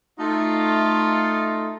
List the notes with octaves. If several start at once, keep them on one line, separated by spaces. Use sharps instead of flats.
A3 D#4 F4